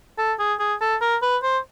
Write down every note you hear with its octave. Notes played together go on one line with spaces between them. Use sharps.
A4
G#4
G#4
A4
A#4
B4
C5